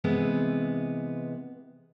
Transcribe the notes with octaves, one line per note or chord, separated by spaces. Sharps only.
C3 E3 G#3 B3